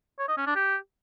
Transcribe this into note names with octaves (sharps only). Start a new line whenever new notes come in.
C#5
D#5
C#4
D4
G4